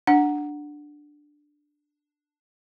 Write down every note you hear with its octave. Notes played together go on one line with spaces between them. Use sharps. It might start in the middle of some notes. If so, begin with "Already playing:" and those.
D4 F#5